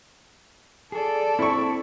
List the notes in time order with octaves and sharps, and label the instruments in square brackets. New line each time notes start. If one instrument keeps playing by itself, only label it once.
[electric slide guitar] G#4 [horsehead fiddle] A4 D5
[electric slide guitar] C4 [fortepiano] E4 C#6